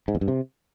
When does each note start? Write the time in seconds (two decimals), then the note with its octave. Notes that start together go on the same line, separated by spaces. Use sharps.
0.08 G#2
0.15 E2
0.21 G2
0.28 C3